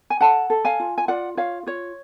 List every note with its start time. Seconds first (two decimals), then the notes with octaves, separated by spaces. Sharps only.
0.10 G#5
0.21 A4 F#5 A5
0.50 A4
0.65 F5 G#5
0.80 F4
0.98 G#5
1.08 F4 D5 F#5
1.37 F4 C#5 F5
1.67 F4 C#5